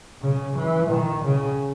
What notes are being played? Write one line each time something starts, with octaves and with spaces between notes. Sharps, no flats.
C#3
E3
D#3
C#3